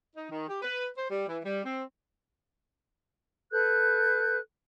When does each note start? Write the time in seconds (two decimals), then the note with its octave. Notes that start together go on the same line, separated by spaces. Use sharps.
0.16 D#4
0.30 D#3
0.48 G4
0.62 B4
0.97 C5
1.10 G3
1.28 E3
1.45 G3
1.65 C4
3.52 A4 B4 F#6 G6